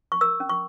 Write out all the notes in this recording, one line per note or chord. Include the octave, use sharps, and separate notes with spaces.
C#6
A#4 E6
C#4
C#6